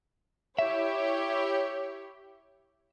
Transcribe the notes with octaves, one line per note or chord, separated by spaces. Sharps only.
E4 G4 C#5 E5